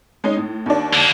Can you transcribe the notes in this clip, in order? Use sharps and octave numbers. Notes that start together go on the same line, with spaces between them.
G#3 C#4 D#4
A2
D#2 D4
D3 A#3